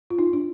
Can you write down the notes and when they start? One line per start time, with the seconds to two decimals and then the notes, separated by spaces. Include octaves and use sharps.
0.10 F4
0.19 D#4
0.33 D4